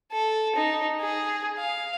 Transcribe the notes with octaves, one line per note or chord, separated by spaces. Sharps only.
A4
D#4
G#4
F5